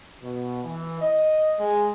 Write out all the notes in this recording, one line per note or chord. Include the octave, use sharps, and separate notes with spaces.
B2
E3
D#5
G#3